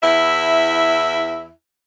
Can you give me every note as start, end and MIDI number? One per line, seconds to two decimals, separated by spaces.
0.01 1.49 40
0.01 1.49 64
0.01 1.49 76